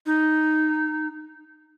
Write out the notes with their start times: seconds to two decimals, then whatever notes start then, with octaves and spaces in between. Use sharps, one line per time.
0.06 D#4